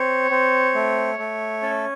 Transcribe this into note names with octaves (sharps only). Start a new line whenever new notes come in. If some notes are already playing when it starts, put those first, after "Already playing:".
Already playing: C4 C#5
C4
A3
A3
C#4 A4